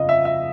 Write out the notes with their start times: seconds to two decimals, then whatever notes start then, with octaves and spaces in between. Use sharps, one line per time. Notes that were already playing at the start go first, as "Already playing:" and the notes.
Already playing: G1 F2 C#3 D#5 F5
0.09 E5
0.25 E5